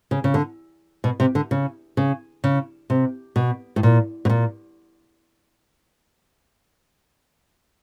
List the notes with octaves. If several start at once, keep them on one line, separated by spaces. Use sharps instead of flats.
C#3
C#3
D3
B2
C3
D3
C#3
C#3
C#3
C3
B2
A2
A#2
B2
A#2